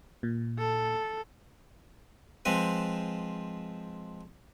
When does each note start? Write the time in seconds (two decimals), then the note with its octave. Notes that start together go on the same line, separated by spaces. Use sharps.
0.23 A#2
0.59 A4
2.45 F3 G#3 C4 B4